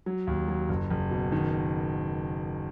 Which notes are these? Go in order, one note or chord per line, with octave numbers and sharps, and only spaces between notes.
F#3
D#2
F#3
F#1
F#1
B2
D#3